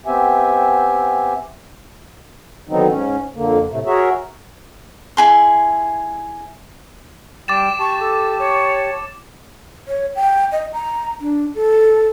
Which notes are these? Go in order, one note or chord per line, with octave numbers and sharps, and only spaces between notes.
B3 C4 G4 E5 G#5
D3 D#3 F#3 B3 C4 D#4
G#2 C#4
F2 D3 A#3
A2 C3 A3
F#4 G#4 A#4 C#5 E5
E4 G#4 C6
G3 G5 D6 A6 E7
G4 A5 C#6
A4
C#5
C#5
G5
D#5
A#5
D4
A4